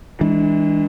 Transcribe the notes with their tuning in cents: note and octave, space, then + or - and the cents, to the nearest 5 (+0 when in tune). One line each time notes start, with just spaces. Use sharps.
E3 -30 G#3 -20 D4 +0